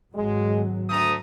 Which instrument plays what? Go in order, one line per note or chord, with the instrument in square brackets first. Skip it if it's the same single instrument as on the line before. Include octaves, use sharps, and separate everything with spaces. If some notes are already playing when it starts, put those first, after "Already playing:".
[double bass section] G#1 F#3 [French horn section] G#3
[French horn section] D2 [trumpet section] A3 A#5 D#6